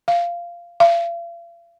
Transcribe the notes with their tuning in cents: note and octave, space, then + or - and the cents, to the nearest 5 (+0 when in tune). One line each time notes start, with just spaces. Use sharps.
F5 -15
F5 -40